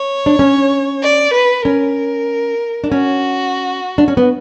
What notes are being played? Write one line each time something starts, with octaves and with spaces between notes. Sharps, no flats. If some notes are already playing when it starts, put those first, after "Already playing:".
Already playing: C#5
D4
C#4
D5
B4
C#4 A#4
D4
C#4 F#4
D4
C#4
B3